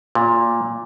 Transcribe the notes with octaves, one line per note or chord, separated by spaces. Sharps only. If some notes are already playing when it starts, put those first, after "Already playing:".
A#2